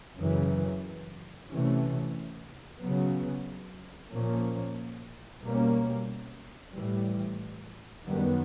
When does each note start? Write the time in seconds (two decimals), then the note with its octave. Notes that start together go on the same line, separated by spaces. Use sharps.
0.18 F#2 C#3 E3
1.49 C3 E3 A3 C#4
2.80 C#3 F#3 B3
4.12 A#2 F3 A#3 C#4
5.42 B2 G3 A#3 C#4
6.74 A2 E3 G3
8.06 F#2 D#3 G3 B3